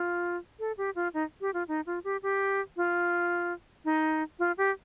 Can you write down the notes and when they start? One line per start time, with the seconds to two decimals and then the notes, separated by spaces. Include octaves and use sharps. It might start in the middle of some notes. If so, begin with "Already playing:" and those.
Already playing: F4
0.60 A4
0.78 G4
0.95 F4
1.14 D#4
1.41 G4
1.54 F4
1.68 D#4
1.86 F4
2.04 G4
2.23 G4
2.77 F4
3.85 D#4
4.39 F4
4.58 G4